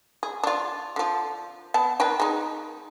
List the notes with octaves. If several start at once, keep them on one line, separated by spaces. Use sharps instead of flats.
G#4
D4 F4
D3 F3
B3 A5
D#3 B4 G5
G#3 D#4